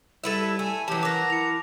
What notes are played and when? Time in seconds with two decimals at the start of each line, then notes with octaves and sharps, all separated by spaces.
0.24 G3 E4 A4 B4 E5
0.59 A3 G#5
0.88 E3 F#3 C#4 G4 A5
1.03 F#3 A#4 F#5 D6 A#6
1.30 E4 C#7 F7